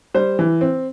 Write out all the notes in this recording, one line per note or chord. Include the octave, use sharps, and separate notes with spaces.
G3 C5
E3
C4